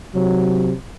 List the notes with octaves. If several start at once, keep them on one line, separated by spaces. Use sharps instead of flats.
C3 F#3